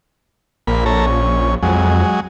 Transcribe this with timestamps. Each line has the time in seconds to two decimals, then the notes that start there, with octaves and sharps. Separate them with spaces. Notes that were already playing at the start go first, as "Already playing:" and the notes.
0.67 A#1 A#2 B5
0.86 A4 C#5 A#5
1.06 C#4
1.63 F2 F#3 G#3